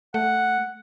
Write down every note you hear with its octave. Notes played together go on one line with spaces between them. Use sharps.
A3 F#5